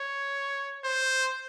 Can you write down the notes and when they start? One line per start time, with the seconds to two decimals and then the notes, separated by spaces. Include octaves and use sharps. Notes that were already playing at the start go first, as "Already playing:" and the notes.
Already playing: C#5
0.85 C5